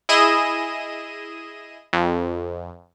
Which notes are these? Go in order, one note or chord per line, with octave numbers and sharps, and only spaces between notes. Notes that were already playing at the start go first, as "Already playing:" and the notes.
E4 G#4 D#5 D#7 E7
F2